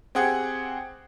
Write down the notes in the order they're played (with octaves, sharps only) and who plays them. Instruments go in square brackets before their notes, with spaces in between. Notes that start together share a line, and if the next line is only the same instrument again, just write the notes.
[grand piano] C4 G4 G#4 F#5